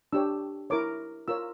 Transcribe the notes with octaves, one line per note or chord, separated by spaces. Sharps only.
D4 G4 C#5 E6
E4 A#4 C#5 D6
F4 A#4 C#5 E6